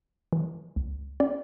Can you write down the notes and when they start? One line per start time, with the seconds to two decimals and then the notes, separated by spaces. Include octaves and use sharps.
0.33 E3
0.76 C#2
1.20 C#4 D5